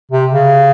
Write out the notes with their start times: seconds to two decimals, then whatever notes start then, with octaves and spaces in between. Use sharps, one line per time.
0.11 C3
0.32 C#3